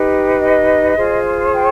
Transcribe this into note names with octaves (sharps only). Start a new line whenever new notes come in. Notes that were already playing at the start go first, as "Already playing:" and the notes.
Already playing: D#4 G4 B4
D#5
F4 G#4 C5
G5